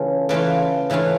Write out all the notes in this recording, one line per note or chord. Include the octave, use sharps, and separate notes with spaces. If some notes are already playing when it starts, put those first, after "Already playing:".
Already playing: C#3 E3 A3 C#4 F4
C#3 E3 A3 C#4 F4
C#3 E3 A3 C#4 F4